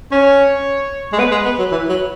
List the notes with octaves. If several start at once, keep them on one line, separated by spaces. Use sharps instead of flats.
C#4 C#5
G#3
B3 B4
G#3
B3
F#3
E3 B4
F#3